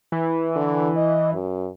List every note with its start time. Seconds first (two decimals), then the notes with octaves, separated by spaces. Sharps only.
0.12 E3
0.56 D3
0.97 D#5
1.33 F#2